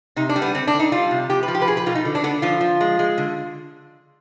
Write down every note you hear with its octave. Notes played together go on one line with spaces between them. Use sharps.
C3 D#4
D4
G3
B3
D3 C4
D4
D3
D#4
G3 F4
C3
F3 G4
B4
F3
G4
B4
B2 G#4
B4
B2 F4
D#4
D3
D4
D3 B3
F3 F4
F3
G#3
G#3
D3